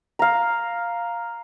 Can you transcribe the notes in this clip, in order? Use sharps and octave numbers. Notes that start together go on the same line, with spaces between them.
F5 A#5